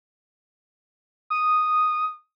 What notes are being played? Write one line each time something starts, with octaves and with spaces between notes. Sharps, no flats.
D#6